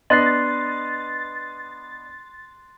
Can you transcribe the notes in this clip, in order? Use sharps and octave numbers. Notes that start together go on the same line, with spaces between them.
B3 D4 D#5 C6 F#6 A6 C7